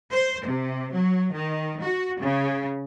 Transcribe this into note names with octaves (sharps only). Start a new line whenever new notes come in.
C5
C3
F#3
D#3
F#4
C#3